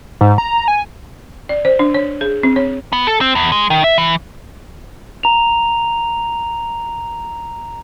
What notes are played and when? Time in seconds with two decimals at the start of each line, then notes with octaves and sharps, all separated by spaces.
0.21 G#2
0.38 A#5
0.68 G#5
1.49 D5
1.65 C5
1.79 D4
1.94 C#5
2.21 G#4
2.43 C4
2.56 C#5
2.93 B3
3.07 A4
3.21 C4
3.35 E2
3.52 G#3
3.70 D#3
3.84 E5
3.98 E3
5.23 A#5 F7